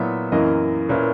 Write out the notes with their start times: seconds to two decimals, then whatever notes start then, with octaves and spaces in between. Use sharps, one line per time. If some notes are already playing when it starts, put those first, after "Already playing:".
Already playing: A#2 F#3 B3 E4 E5
0.32 F#2 E3 A#3 E4 D#5
0.89 A#2 A#3 C#4 E4 B4